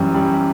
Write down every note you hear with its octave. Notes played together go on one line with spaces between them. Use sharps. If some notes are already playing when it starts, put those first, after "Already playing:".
Already playing: F#2 E3 G3
G3